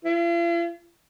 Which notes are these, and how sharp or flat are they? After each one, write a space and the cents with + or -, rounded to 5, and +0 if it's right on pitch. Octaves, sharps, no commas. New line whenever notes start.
F4 -45